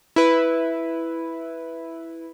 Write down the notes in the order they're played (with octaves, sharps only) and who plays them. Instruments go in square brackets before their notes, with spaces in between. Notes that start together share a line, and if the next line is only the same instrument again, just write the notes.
[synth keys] E4 B4